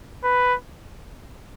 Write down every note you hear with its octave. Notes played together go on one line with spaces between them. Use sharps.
B4